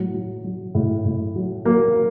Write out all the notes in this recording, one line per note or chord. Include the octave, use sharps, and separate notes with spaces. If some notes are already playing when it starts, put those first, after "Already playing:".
Already playing: A2 F#3
F#3
F#3
A2
A2
F#3
F#3 A#3